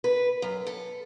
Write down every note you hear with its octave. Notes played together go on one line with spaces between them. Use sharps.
B4
F#2
A4